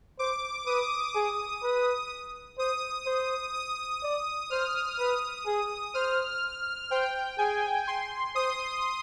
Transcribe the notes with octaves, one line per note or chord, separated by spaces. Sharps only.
C5 D6
B4 D#6
G#4
B4
C5 D#6
C5
D#6
D5
C5 F6
B4 D#6
G#4
C5 F6
C5 G5
G#4 G#5
C6
C5 D#6